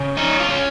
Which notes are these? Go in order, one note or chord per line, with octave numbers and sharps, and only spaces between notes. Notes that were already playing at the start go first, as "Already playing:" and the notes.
Already playing: C#3
C#4 D#4
F4
C#4